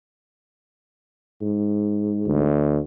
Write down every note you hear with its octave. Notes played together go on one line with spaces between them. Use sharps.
G#2
D2